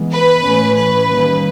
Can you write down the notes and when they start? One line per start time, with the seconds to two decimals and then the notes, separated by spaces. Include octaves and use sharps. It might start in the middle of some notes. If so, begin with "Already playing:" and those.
Already playing: E3 G#3 B3
0.11 B4
0.43 A2 E3 A3 C#4
0.75 B4
1.07 D#3 G3 A#3 C#4